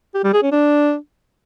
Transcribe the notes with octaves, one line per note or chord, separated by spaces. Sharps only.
G4
G3
G#4
C#4
D4